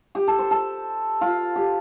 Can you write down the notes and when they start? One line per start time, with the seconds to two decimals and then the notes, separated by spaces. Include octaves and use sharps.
0.15 G4
0.27 A4
0.39 C5
0.51 A4
1.21 F4
1.56 G4